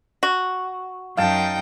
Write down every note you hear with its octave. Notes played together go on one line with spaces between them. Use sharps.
F#4
F#2 D#4 F5 G5 A5